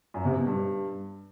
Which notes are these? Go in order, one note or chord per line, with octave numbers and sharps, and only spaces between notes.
F#2
C3
B2
G2